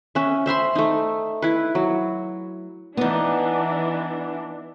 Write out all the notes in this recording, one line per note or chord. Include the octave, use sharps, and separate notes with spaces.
C#4 E5
C5 E5 B5 C6
A3 D#4
E4 B4
F#3
E3 B3 D4 D#4